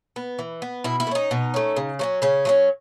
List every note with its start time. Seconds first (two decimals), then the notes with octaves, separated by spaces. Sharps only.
0.16 B3
0.39 E3
0.62 B3
0.84 B2 E4
1.00 E4
1.07 A3
1.11 C#4 D#4
1.31 B2
1.54 A3 C#4
1.76 C#3
1.99 F#3 A3 C#4
2.22 C#3 C#4
2.45 F#3 A3 C#4